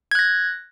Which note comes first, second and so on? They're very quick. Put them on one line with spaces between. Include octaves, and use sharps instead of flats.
G#6 F#6 A#6